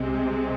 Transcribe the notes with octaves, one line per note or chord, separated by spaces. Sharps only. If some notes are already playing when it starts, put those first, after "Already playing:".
Already playing: C2 C3 G#3 C4